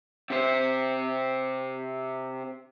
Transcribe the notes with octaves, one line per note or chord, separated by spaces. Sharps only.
C3 C5